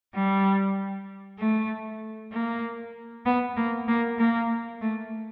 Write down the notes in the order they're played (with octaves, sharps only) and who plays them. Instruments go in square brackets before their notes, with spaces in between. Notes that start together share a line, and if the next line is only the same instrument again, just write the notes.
[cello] G3
A3
A#3
B3
A#3
A#3
A#3
A3